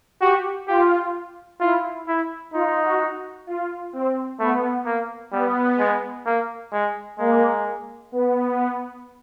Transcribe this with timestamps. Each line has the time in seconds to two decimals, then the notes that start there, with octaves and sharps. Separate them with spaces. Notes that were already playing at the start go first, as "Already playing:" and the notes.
0.21 F#4 G4
0.68 F4 G4
1.60 E4 F4
2.07 E4
2.53 D#4 F4
2.84 F#4
3.47 F4
3.93 C4
4.39 A3 B3
4.86 A#3
5.32 G3 B3
5.79 G#3
6.26 A#3
6.73 G#3
7.18 G#3 A#3
8.12 B3